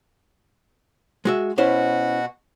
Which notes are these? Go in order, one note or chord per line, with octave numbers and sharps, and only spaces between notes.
G#3 F#4 E5
B2 C#4 E4 F#4 C5